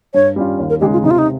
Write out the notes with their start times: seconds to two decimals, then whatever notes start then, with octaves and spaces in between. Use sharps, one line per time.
0.14 G2 C#5
0.36 G3 C#4 F4
0.59 D#2
0.70 A#4
0.81 C#3 G#3 D#4 G4
0.93 F4
1.04 C3 D#4
1.11 F4
1.18 D#4